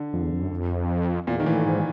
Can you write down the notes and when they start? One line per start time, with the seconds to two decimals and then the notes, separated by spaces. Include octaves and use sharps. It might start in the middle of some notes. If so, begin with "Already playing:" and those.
Already playing: D3
0.13 F2
0.22 E2
0.32 F2
0.41 F#2
0.51 F2
1.27 E2 A#2
1.40 D#3
1.46 A2 E3
1.65 G#2